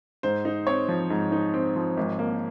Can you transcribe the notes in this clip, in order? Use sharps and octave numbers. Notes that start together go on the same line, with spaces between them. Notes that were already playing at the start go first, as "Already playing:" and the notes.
G#2 C5
D#4
C4 C#5
F3
G#2
D#4
C4
F3
G#1
A#3